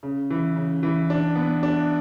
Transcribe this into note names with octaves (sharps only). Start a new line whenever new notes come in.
C#3
E3
C#3
E3
D4
B3
D4